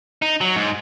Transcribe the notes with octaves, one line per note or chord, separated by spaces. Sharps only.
D#4
F#3
G#2